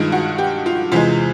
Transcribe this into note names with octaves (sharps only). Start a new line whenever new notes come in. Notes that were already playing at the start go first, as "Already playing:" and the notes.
Already playing: G2 D#3 G#3 F4
F#4
G4
F4
E2 C3 E3 G#3 F4